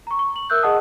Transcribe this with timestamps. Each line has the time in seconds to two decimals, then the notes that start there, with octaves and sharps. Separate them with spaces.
0.07 A#5 C#6
0.19 C#6
0.36 F#7
0.50 A#4 E5 E6 F#6 G6
0.62 G#4 D#5 F#5 A5 D#6